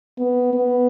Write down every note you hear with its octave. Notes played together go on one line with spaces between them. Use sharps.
B3
B3